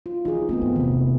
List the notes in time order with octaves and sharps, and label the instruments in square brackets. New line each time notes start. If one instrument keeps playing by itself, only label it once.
[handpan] F4
[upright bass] E3 [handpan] D#4 F#4 G#4
[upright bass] G#3 [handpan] A3 B3 C4
[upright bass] G2 E3
[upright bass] E1 C3 [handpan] D#3